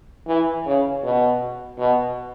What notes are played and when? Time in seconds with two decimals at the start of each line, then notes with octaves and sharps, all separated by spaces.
0.28 E3
0.66 C#3
1.04 B2
1.79 B2